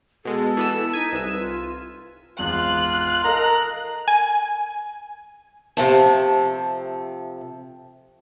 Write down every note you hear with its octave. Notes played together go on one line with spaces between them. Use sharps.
B2 G#3 A4
E3 B3 E6
D#4 G#5 B6 D#7
C2 B4 E6
F4
G#1 E2 F4 F#6
A4 A#4 D#5 F5 A#5
G#5
C3 F3 A3